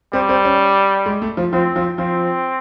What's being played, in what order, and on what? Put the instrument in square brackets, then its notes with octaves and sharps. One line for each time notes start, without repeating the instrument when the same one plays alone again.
[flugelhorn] G3 [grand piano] C4
[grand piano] C4
C#4
G#3
A3
F3
[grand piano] F3 [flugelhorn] C4
[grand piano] F3
[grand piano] F3 [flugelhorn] C4